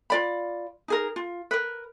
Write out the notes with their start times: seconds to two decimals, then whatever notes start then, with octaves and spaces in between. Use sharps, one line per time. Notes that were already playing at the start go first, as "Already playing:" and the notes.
0.10 F4 D5 B5
0.88 D#4 G#4 A#4
1.16 F4
1.51 A#4 B4